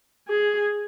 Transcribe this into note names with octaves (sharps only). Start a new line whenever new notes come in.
G#4